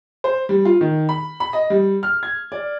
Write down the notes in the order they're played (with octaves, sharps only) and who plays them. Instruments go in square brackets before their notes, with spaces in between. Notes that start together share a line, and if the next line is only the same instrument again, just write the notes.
[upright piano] C5
G3
F4
D#3
B5
B5
D#5
G3
F6
G#6
D5